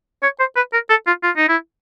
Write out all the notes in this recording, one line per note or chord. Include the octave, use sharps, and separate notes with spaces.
C#5
C5
B4
A#4
A4
F4
F4
D#4
E4